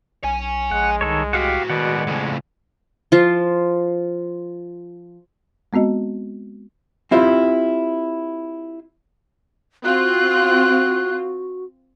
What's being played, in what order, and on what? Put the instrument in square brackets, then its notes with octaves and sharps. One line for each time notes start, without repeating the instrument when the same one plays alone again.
[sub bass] B1 [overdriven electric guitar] C#5 G#5
[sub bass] A#1 [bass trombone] G#3 [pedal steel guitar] F#5
[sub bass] C2 [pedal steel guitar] D#3 A4 C#5
[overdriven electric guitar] A2 F#4 [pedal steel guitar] G4 F5 F#5
[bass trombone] B2 [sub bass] D#3 [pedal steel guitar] G#3 D5 F#5
[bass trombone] F2 [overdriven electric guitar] A2 C#3
[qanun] F3 F4
[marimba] G#3 B3 C4 F#4 D#5
[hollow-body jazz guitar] C4 E4 F4 G4 C5
[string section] C4 F4 [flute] F#4 [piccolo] F#6